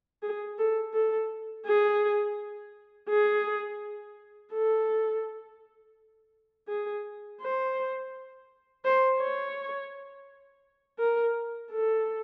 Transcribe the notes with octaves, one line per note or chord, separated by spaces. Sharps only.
G#4
A4
A4
G#4
G#4
A4
G#4
C5
C5
C#5
A#4
A4